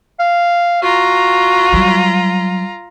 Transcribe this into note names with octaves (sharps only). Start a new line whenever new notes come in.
F5
F4 F#4 A#5
F#3 G3